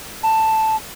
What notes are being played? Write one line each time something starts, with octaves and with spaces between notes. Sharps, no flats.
A5